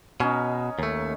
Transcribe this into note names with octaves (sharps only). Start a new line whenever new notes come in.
B2 C#4 D#4
D#2 A3